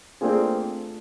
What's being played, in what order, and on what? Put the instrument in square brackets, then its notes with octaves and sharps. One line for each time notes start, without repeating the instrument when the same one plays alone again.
[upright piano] A3 D4 F4 G#4 [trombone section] A#3 C4